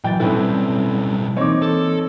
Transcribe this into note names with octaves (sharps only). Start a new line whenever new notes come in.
A#2 E3 F#3 G5 A6
B1 A2 G3 C4 C#4 E4 A4 B4
E3 A#3 C4 D#4 C#5 D6
A4